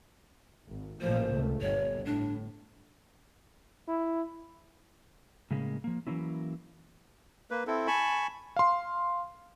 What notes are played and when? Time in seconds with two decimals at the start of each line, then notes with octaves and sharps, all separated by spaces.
0.67 G#1
1.02 A1 A#2 F3 C5
1.33 C#2 A3
1.62 G1 C#5
2.05 A2 D4
3.88 E4
5.51 A2 C#3 G#3 A#3 C#4
5.84 F3 A#3
6.07 E3 F#3 A#3 C#4 E4
7.51 A#3 B4
7.67 C4 E4 A4
7.87 G#5 A5 B5 C#6
8.56 F5 C6